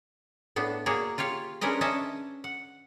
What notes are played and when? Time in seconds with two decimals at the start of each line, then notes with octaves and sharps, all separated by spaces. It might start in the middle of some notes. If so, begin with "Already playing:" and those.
0.56 A2 B3 D4
0.86 A#3 F#4 G#4 C#5 D5
1.18 F4 G4 C#5 F5
1.61 G#3 C#4 D4 A#4 B4 D#5
1.81 C#4 D4 D#5 E5 A5
2.44 F#5